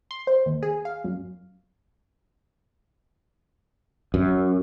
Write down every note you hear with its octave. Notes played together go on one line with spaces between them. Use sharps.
C6
C5
D#2
G#4
F5
F#2
F#2